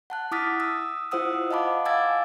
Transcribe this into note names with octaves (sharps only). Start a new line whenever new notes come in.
F#5 A5 F#6
E4 D6 D#6 F6 A6 B6
D#6 E6
E4 F4 C5 F#5 D#6 E6
D#5 F5 F#5 A5 B5 D6
F5 G#5 D6 E6 G#6 A6